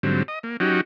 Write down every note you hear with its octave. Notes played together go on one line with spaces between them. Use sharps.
G#2 D3 F#3 G3 C4
D#5
A#3
F#3 C#4 D#4 F#4 G4